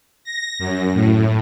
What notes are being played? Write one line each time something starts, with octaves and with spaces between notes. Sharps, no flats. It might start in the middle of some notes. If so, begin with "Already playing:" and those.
A#6
F#2
A2